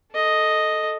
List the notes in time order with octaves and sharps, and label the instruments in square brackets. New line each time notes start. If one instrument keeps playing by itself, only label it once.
[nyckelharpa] A4 D#5